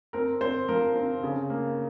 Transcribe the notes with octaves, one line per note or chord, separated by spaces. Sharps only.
C4 A#4
C4 C5
F3 A#4
C4
C#3
A#3